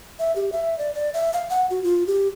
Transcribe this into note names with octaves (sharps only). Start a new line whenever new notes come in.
E5
G4
E5
D5
D5
E5
F5
F#5
F#4
F4
G4